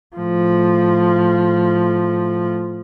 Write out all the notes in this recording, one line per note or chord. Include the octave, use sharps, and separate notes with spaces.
A2 F3